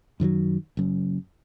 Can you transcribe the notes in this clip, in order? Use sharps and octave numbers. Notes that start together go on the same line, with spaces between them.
F#2 D#3 E3 F#3
F#1 F#2